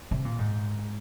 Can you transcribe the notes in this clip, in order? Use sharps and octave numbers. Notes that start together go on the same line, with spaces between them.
C3
A#2
G#2